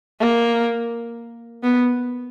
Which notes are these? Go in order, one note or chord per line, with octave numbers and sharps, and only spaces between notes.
A#3
B3